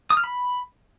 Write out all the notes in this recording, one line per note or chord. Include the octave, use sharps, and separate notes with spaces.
D#6
F6
B5